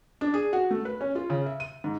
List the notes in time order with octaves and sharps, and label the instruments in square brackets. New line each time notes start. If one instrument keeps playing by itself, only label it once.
[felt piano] D4
G#4
F#4
A3
B4
C#4
F4
C#3
E5
D#7
G#2